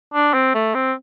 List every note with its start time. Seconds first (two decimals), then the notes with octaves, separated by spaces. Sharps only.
0.14 D4
0.34 C4
0.54 A3
0.75 C4